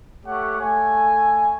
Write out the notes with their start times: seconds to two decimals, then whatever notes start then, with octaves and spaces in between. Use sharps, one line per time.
0.24 A3 G4 C#5 F#5
0.59 A3 G#5